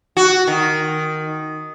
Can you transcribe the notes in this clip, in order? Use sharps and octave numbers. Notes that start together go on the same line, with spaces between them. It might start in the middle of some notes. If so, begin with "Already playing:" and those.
F#4
D#3